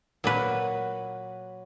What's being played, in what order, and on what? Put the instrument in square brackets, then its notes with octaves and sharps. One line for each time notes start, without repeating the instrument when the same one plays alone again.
[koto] A#2 A#3 B4 [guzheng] F#3 F#5